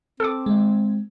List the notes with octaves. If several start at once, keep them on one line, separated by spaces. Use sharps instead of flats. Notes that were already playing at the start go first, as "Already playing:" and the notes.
C4 A4 D6
G#3